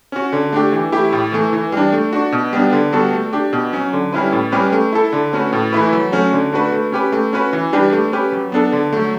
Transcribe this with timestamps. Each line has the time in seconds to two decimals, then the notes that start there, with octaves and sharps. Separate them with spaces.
0.12 C#4 F#4
0.32 D3
0.53 A3 D4 G4
0.72 E3
0.92 A3 E4 G4
1.12 A2
1.32 E3 A3
1.53 E3
1.72 G3 D4
1.93 A3
2.13 D4 F#4
2.32 B2
2.53 G3 B3 D4
2.73 D3
2.92 G3 B3 F#4 A4
3.13 A3
3.33 D4 G4
3.53 B2
3.73 F#3 C#4
3.93 D3
4.13 G3 C#4 E4 B4
4.32 A2
4.52 G3 C#4 G4 B4
4.73 A3
4.93 E4 A4
5.13 D3
5.33 A3 C#4 F#4 B4
5.53 A2
5.73 E3 A3 E4 B4
5.93 F#3
6.12 A3 C#4 F#4
6.33 D3
6.53 A3 D4 F#4 B4
6.72 A3
6.92 C#4 G4 B4
7.12 A3
7.33 C#4 F#4 B4
7.53 E3
7.73 G3 D4 G4 B4
7.93 A3
8.12 C#4 G4 B4
8.32 F#3
8.52 B3 D4 A4
8.72 D3
8.93 F#3 A3